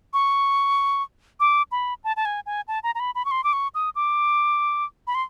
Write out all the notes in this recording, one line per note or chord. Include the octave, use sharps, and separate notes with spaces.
C#6
D6
B5
A5
A5
G#5
G#5
A5
A#5
A#5
B5
B5
C#6
C6
D6
C#6
D#6
D6
B5
C6